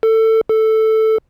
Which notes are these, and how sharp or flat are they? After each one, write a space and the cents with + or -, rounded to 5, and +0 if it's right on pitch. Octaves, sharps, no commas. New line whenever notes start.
A4 +20
A4 +0